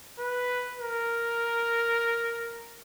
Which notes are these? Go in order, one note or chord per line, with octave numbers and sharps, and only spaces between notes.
B4
A#4